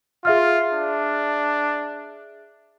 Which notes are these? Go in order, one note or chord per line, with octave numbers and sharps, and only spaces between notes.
F4 G#4 E5 F6
D4